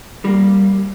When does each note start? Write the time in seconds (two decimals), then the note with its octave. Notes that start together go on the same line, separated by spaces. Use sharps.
0.25 G3 A#3